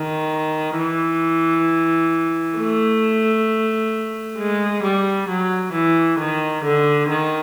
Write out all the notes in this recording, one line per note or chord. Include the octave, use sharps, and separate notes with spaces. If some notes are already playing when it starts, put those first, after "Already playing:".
Already playing: D#3
E3
A3
G#3
G3
F#3
E3
D#3
D3
D#3